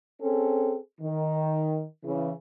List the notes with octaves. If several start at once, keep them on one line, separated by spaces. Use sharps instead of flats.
C4 C#4 G#4 A4
D#3
C#3 E3